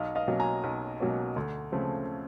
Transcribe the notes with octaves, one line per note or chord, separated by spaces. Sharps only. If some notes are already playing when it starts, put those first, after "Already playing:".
Already playing: B1 D#5 F5
D#5 F5
B2 F#3 A#3 C#4
G#5 A#5
B1
B2 F#3 A#3 C#4
D2
C#3 F3 A3 C4